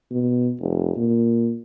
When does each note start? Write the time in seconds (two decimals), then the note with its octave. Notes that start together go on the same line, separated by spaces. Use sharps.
0.11 B2
0.60 F1
0.97 A#2